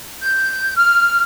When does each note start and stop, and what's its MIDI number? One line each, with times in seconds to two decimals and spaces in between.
0.23 0.72 91
0.77 1.23 89